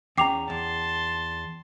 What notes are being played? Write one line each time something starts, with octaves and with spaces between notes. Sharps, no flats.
E2 C#4 G5 A#5 D6 C7 F7
E2 A5 C6